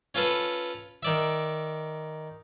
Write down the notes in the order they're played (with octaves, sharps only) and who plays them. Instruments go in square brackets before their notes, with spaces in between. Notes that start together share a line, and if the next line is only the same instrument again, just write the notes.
[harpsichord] C#4 F4 A4 B4
D#3 D5 E5